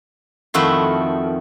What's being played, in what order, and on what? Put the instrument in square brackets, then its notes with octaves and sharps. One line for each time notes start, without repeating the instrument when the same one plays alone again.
[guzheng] F2 D#3 A3 E4 F#4 C6